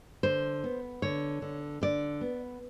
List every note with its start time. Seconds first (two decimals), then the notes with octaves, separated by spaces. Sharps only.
0.23 D3 C5
0.64 B3
1.02 D3 C#5
1.42 D3
1.81 D3 D5
2.21 B3